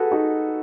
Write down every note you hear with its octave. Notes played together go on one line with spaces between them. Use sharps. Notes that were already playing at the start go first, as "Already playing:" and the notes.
Already playing: F#4 G#4 A4 B4
D#4 F#4